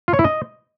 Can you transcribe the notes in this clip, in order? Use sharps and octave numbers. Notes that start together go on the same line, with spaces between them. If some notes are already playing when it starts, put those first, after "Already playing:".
F4
C#5
E4
D#5